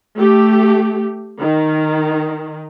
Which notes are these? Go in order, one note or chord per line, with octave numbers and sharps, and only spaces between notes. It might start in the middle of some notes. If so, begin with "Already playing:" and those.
A3 G4
D#3